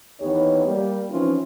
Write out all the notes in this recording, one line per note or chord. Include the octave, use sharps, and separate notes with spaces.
D#2 E3 B3 D#4 G4 C#5
G3 A#3
E3 F3 C4 C#4 D#4 F4